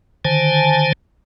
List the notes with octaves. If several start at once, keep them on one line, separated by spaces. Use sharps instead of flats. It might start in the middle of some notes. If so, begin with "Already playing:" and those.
D3 D#3 C5 G#5 A5